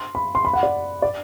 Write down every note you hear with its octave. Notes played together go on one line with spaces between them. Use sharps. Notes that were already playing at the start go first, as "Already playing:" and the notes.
Already playing: C6
B5
C6
B5
F#5
D5
D5